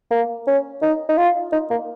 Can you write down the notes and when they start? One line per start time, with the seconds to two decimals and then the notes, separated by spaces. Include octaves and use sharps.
0.11 A#3
0.47 C#4
0.82 D#4
1.09 D#4
1.18 F4
1.53 D#4
1.70 A#3